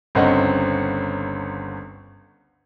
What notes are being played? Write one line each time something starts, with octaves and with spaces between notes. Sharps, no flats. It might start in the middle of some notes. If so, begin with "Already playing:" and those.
G1 C#2 C4 C#4 D#5 F#5